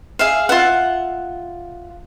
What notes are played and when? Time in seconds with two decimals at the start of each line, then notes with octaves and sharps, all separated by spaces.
0.19 G#4 E5 F5
0.49 F4 E5 F#5